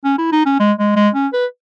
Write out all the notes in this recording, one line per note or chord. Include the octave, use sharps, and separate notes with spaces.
C#4
E4
D#4
C#4
G#3
G#3
G#3
C#4
B4